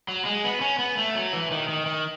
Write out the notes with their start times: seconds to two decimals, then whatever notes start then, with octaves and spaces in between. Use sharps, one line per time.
0.08 F#3
0.26 G#3
0.44 B3
0.61 C#4
0.79 B3
0.97 A3
1.15 F#3
1.33 E3
1.51 D#3
1.69 D#3
1.86 D#3